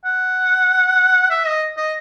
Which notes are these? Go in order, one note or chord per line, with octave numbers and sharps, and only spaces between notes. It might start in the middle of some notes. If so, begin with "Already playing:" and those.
F#5
E5
D#5
D#5